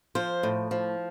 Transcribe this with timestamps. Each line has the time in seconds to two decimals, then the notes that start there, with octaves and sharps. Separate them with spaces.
0.15 F3 C5
0.43 A2
0.71 F3